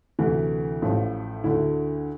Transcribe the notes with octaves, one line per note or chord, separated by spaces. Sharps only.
D2 C3 E3 A3
A1 A2 F3
D2 D3 A3 E4